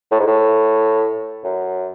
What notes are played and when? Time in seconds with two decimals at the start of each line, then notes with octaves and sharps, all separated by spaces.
0.11 A2
0.19 G#2
0.27 A2
1.44 F#2